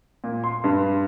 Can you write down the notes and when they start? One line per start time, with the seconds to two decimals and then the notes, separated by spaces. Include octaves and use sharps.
0.24 A#2
0.44 C6
0.64 G2